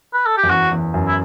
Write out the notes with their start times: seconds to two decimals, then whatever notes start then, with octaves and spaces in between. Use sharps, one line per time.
0.14 B4
0.26 A4
0.37 G4
0.43 F#2
0.50 E2 F#4
0.72 E2
0.94 F#2
1.07 E4